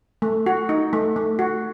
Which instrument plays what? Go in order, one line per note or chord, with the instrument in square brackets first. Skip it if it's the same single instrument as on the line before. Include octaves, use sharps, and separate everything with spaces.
[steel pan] A3
F#4
D#4
A3
A3
F#4